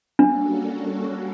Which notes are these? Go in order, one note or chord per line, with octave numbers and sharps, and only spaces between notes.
G3 A#3 C#4 D4 F#4 A4